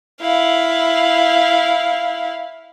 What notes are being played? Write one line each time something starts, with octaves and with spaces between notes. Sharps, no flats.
E4 F5